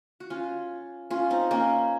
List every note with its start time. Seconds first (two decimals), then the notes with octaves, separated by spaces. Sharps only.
0.20 F#4
0.30 C#4 F4
1.10 C#4 F4
1.30 C4 D#4
1.51 A#3 C#4